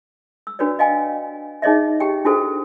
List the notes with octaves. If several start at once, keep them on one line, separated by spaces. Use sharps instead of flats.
E6
D4 F#4 B4 C#5 D5
D#5 F5 G5 G#5
D#4 G#4 C#5 D#5 E5
G4 G5
D4 E4 F#4 G#4 A4 C5